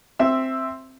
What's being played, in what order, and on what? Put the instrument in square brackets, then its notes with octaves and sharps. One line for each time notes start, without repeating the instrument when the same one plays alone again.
[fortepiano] C4 E5 E6